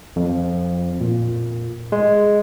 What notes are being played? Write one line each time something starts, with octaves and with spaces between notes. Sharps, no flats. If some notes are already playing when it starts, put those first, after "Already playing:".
F2
A#2
G#3